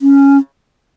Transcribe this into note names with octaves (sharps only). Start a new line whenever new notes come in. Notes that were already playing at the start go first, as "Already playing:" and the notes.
C#4